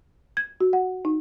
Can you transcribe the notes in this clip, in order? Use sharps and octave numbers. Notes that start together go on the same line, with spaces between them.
G#6
F#4
F#5
D#4